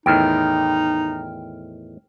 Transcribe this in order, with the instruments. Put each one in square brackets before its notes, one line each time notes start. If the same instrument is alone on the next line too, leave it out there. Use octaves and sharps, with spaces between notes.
[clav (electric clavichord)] E2 A2 D#3 [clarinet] D#4 [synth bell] G5 F6